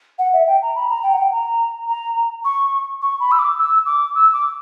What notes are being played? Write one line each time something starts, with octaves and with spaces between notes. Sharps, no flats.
F#5
E5
G5
A#5
B5
A#5
G5
F#5
G5
A#5
A#5
C#6
C#6
B5
E6
D6
E6
D6
E6
D6